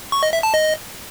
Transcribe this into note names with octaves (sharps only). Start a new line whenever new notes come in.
C#6
D#5
E5
A5
D#5